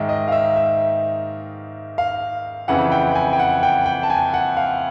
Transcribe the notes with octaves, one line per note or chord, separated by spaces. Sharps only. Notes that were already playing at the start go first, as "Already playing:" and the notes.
Already playing: G#2 D#3 E5
D#5
F5
E5
E5
F5
F2 C#3 E3 F#5
G5
G#5
G5
F#5
G5
G5
A5
G#5
F#5
F5